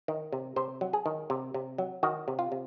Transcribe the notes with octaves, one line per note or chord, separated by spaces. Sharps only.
D#3
C3
C3 C5
F#3
G#4
D#3
C3
C3
F#3
D#3 F#4
C3
F4
C3